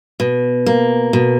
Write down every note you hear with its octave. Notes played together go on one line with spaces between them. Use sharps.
B2
A#3
B2